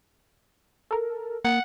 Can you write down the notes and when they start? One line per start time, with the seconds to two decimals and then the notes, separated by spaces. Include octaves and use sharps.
0.91 A4 A#4
1.45 A#3 F#5